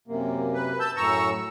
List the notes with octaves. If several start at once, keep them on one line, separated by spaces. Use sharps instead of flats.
F#2 C3 A#3
B4
A5 E6 G6
F#2 A2 A#5 C#6 E6